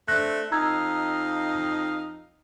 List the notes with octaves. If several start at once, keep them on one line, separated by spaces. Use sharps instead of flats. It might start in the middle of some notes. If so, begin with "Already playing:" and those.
A3 C4 D4 F#6 A#6
F2 D#4 D#5 F5 A#5 E6 G#6